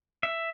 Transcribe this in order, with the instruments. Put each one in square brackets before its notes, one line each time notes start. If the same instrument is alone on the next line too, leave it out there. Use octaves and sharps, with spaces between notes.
[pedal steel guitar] E5